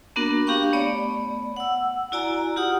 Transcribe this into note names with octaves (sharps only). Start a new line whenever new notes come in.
A#3 B3 D4 F#4 A#4
D4 G4 F5 G5 C#6
A3 B3 C#5 D5
F#5 E6
E4 F#4 D5 G#5 A#5
F4 G4 F#5 D#6